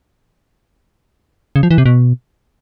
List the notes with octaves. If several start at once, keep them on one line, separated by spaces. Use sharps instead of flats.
C#3
F3
E3
C3
B2